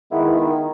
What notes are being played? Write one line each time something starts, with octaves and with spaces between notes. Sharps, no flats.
D#3 G#3 B3 E4
D#3